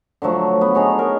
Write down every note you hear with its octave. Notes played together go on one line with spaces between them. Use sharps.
D3 F3 F#3 A3
B3
D#4 G#4 C#5
A#4